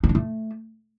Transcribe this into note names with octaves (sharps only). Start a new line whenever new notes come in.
D#4
D4
A3